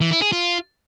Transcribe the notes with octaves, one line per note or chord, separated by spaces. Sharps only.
E3
E4
G#4
F4